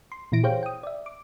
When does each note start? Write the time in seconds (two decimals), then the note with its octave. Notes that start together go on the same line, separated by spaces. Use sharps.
0.12 C6
0.32 A#2 E3 E4 A#6 D7
0.43 G4 G#4 C5 C#5 F5 G5
0.63 G5 D#6
0.83 D5 E5
1.06 D6